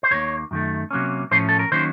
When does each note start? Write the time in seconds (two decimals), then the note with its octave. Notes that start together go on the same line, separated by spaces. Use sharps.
0.03 C5
0.11 D#2 D#3 A#3 C#5
0.51 F#2 D#3 A3
0.91 C3 F#3 A#3 C#4
1.31 A2 F3 A3 C#4 C5
1.49 A4
1.59 A#4
1.72 D#3 F#3 A#3 C#4 C5